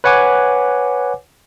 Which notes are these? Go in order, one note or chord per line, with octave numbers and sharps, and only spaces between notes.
B4 C#5 F#5 G#5 D6